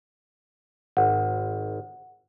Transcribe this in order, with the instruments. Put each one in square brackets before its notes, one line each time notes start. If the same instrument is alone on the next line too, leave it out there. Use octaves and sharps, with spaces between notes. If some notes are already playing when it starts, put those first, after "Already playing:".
[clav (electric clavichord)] G#1 [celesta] F#5